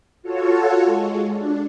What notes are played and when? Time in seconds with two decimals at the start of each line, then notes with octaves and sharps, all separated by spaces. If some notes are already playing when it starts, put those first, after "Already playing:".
0.22 F4 F#4 A4 C#5
0.84 G#3
1.32 D4